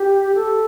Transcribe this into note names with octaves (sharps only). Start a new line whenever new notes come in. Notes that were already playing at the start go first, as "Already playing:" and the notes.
Already playing: G4
A4